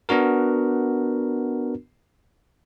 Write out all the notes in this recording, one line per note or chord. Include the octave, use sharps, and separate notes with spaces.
B3 D4 F#4 A#4